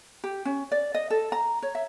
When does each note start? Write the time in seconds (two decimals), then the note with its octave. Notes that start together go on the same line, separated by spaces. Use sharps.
0.24 G4
0.45 C#4
0.72 D5
0.95 D#5
1.10 A4
1.32 A#5
1.63 C#5
1.75 E5